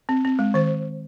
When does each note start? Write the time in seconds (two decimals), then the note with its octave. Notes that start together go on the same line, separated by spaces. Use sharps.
0.09 C4
0.25 C4
0.39 G#3
0.54 D#3 C5